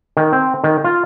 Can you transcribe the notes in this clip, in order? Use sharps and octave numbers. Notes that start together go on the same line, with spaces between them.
D#3
C4
D#3
F4